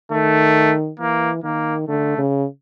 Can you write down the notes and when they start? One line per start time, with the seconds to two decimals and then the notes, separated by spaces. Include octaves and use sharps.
0.11 D#3 A3
1.00 E3 A#3
1.44 D#3 A#3
1.88 D3 A3
2.18 C#3